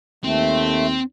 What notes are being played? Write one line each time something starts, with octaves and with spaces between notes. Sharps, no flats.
D#2 A3 C4